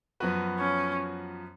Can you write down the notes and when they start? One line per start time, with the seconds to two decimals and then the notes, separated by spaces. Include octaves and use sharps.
0.20 F#2 F3 B3 F#4 B4
0.59 C#4